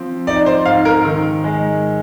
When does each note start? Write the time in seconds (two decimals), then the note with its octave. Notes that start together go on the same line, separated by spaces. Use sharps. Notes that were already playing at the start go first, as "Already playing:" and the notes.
Already playing: F3 C4
0.27 D#4 D5
0.46 C5
0.66 G#2 F5
0.85 A#4
1.05 D#3
1.44 G#3